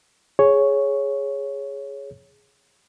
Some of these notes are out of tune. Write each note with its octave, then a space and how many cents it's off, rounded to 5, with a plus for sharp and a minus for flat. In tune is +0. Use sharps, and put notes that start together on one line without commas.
G#4 +0 C#5 +0